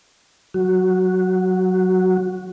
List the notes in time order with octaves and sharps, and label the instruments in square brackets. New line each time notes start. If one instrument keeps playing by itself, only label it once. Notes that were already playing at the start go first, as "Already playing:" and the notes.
[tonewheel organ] F#3 F#4